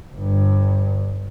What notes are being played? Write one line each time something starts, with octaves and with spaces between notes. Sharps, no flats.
G1 G2